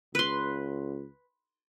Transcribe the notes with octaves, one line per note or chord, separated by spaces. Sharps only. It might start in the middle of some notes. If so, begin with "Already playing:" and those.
C#2 B4 C6